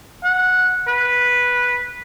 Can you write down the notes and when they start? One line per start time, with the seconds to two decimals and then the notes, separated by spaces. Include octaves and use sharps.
0.24 F#5
0.88 B4